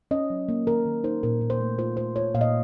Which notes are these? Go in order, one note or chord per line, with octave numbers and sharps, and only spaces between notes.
C#4 D#5
F#3
A#3
D#3 A#4
D#3
D#4 C5
A#2 A#4
A#2
C5
A3
F4 C5
A3 C5
F4 C#5
A#2 F5
D#5